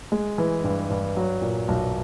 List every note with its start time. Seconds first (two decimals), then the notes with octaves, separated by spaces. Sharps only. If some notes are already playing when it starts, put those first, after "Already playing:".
0.12 G#3
0.38 E3
0.64 G2
0.90 G2
1.17 F#3
1.42 A#2
1.68 B1